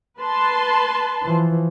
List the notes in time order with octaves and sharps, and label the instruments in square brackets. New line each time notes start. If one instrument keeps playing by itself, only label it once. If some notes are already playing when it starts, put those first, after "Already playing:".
[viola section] B4 A5 C6
[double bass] E3 F3